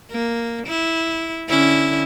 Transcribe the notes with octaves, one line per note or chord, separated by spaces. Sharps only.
A#3
E4
D3 C#4 E4